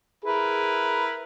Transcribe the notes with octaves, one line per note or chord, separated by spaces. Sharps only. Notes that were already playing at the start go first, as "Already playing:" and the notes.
E4 G#4 A#4 B4